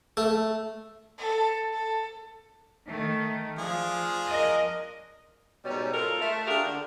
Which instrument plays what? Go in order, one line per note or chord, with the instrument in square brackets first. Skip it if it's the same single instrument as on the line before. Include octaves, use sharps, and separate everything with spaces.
[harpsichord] A3
[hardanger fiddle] A4
A4
[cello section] D#3 A3
[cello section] F3 [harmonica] D4 F4 G#4
[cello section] A#4 D#5
[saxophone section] G#2 B2 G3 C#4
F4 A4 A#4
A3
D4 F4 G4 G#4 A#4
D3